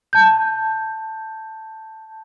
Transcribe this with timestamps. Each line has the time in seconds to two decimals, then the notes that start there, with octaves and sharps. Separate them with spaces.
0.13 A5 G6